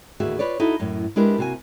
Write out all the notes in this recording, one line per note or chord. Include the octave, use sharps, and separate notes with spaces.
D#2 A2 D3 F#4 G#4 E5
F4 B4 C#5 D5
D#4 E4 F#4 A4
F#2 A2 C#4
G#3 D4 E4 G4 A#4 B4
C3 A#3 F#4 E5 G#5